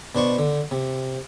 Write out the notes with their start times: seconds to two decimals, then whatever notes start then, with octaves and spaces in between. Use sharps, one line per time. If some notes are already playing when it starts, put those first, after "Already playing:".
0.15 B2 D4 C5 C#6
0.38 D3
0.71 C3